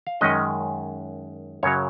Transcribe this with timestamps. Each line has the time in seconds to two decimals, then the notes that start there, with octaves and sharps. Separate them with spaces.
0.07 F5
0.21 F#2 D#3 G#3 C#4 D#5
1.63 F#2 C#3 F#3 C#5